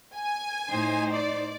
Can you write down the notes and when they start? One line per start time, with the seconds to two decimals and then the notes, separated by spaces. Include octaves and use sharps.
0.16 G#5
0.71 A2 D#4 C5
1.11 D5